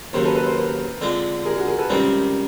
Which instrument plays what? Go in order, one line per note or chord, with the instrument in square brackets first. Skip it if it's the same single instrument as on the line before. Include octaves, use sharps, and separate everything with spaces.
[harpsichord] D#2 C#3 F#3 [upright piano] A#4 C5
[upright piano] A4 B4
A4 B4
A#4 C5
A#4 C5
[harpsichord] D3 F3 G#3 C4
[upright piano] G#4 A#4
F#4 G#4
G#4 A#4
A4 B4
[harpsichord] C#2 C3 D#3 G3 C4 [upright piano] A#4 C5